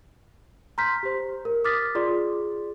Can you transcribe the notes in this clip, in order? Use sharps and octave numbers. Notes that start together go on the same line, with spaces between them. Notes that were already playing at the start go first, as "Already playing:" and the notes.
A#5 C6 F6 G6 B6
G4 C5
A#4
D6 D#6 F6 A6 B6
F4 G#4 D5 C6